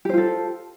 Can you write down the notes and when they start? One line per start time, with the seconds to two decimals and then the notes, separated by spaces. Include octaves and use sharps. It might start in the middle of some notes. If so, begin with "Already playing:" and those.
0.05 G4
0.09 C5
0.13 F4
0.18 A4